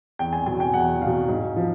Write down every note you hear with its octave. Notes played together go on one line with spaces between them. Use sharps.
E2 G5
G#5
B2 F#3 G#5
G5
E2 F#5
B2 F#3 F5
G#2
F3